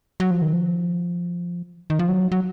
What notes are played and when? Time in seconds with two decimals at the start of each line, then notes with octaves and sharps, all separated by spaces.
0.20 F#3
0.31 F3
0.42 D#3
0.53 F3
1.90 D#3
1.99 F3
2.09 F#3
2.32 F#3